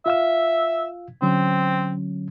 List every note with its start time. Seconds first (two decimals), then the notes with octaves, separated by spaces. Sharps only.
0.06 F4 E5 F5 E6
1.22 D3 F#3 C4 C#4